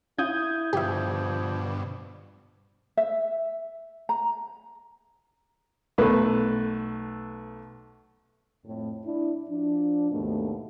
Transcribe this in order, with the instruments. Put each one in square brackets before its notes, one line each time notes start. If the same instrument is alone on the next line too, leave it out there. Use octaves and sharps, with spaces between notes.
[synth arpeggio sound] C#4 F4 [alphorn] E4 [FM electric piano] D#6 G6 G#6
[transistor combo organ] G2 B2 D3 [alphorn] F3 [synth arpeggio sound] G4 E5
[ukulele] E5
A#5
[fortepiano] B1 A3 B4
[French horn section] F2 A2
D4 E4
F3 D4
D#2 G#2 B2 A3